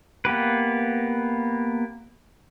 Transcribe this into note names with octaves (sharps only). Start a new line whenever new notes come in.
A#3 B3 G4 B4